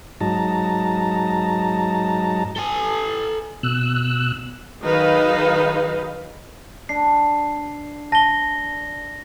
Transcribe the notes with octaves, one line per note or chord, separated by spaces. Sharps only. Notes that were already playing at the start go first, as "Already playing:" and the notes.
G#2 F#3 D#4 A5 A#5
A4 G#5
B2 E6 F#6
D#3 F#3 D#4 G#4 B4 F5
D4 C7
A5 A#6 G7